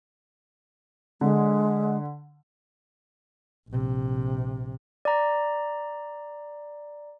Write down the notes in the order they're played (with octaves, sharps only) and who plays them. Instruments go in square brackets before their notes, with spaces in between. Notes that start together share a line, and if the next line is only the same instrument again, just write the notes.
[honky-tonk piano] D3 [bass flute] G#3
[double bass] A#1 C3
[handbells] D5 A#5